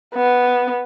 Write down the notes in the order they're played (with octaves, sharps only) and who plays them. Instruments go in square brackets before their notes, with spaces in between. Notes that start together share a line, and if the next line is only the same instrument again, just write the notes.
[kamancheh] B3